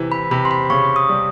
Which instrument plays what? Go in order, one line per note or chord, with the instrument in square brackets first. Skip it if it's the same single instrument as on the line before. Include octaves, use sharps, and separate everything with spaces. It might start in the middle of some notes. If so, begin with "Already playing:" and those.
Already playing: [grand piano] C3 E3
[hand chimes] B5
[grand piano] C3 [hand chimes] B5
[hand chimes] C6
B5
[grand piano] C#3 [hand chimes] C#6
[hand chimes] D#6
[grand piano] G3